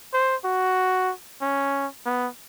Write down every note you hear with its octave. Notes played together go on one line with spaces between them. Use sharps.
C5
F#4
C#4
B3